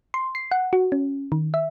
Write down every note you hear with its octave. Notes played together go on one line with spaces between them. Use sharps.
C6
C7
F#5
F#4
C#4
D#3
E5